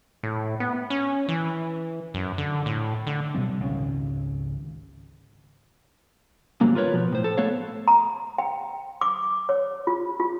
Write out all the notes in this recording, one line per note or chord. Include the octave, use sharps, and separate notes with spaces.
A2
B3
C#4
E3
F#2
D3
A2
D3
B2 F#3 G3 C4
G#1 C#2 C#4
D#2 G#2 F#3 G3 A#3
F4 A#4 B4 C#5
B2 F3
A2 C5
A4
A3 B3 A4 C#5 F5
A#5
G5
D6
C#5
F4
F4